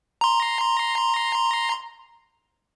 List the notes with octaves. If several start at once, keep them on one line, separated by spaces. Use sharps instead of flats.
A#5 C6